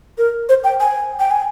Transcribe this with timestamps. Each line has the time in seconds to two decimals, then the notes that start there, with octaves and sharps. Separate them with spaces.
0.18 A#4
0.49 C5
0.64 G5
0.80 G#5
1.20 G5
1.31 G#5